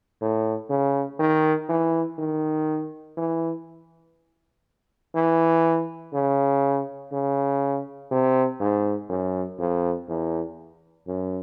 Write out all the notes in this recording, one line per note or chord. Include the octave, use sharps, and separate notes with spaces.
A2
C#3
D#3
E3
D#3
E3
E3
C#3
C#3
C3
G#2
F#2
F2
E2
F#2